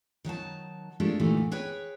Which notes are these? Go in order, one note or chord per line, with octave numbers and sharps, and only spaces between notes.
D#3 F#3 D#4 A5
G#3 A3 D4 F4 G4 A#4
A#2 D3 E3 A3 D#4
G#4 B4 C#5 G5